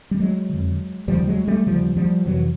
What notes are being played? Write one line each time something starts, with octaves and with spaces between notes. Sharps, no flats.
G3
F#3 G#3
F2 D3
D#2 C#3 F3 G3
F#3 G#3
G3 A3
D#2 C#3 F3 G3
F3 G3
F2 C3 E3 F#3